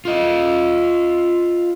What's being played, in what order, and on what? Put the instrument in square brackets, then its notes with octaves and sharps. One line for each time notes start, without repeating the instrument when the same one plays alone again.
[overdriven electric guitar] F4 D#5